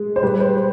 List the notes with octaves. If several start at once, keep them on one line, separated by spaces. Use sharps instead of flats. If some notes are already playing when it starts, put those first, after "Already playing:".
Already playing: G#3
C5
G3 B4
C5